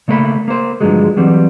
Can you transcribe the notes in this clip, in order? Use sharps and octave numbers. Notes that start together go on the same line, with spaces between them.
C#3 A3 A#3 C#5 B5
A#3 C5
G2 D3 F3 F#3 G#3
E3 F#3 G3 C4